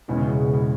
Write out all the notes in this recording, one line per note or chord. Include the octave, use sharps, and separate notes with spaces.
E1 E2 B2 E3 G#3 C#4
C#3
B2
B2